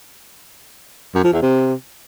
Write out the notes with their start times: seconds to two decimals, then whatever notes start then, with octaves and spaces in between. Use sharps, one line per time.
1.15 F#2
1.24 F3
1.33 E2
1.42 C3